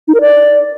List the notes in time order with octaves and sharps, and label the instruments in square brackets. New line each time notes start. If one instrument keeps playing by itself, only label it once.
[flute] D#4
A#4
D5